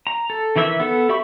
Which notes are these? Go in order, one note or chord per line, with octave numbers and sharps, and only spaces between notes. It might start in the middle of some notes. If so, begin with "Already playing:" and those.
A#5
A4
D#3 E3 E4 E5 E6
B3 A4 E6
G4 E5 B5 C#6